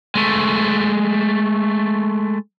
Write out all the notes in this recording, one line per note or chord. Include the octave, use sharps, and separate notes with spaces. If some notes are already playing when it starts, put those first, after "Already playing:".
G#3 A3